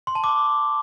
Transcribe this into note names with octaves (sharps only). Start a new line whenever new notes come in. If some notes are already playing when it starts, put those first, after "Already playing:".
C6
A5
D6